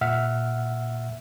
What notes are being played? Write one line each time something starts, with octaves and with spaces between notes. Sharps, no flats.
A#2 E5 F#5 F6